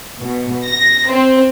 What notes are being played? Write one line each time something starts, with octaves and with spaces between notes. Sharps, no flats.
B2
A#6
C4